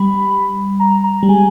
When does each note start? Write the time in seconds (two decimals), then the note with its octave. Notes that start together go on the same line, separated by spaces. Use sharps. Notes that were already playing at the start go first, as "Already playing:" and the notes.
Already playing: G3 B5
0.80 A#5
1.04 A#5
1.23 G3
1.29 G#3 G#5